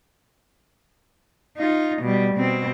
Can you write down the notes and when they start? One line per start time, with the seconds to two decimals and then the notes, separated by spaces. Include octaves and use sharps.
1.58 D#4 F4
2.02 B2 G3
2.35 B2 C4